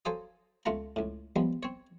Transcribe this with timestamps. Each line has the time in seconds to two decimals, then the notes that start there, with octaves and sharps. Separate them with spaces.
0.05 F#3 A4 C5 F5 G#5 D#6
0.66 C#2 A3 F4 F#5 A#5
0.96 C#2 A2
1.36 F3 G3 G#3 B3
1.63 C4 C#5